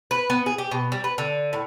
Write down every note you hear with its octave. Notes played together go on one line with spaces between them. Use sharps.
B4
B3
G#4
G4
B2
G3
B4
D3
A2